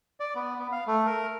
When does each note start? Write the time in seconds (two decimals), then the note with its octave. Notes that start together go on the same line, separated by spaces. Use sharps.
0.20 D5
0.35 B3
0.59 B3
0.72 F5
0.87 A3
1.07 A#4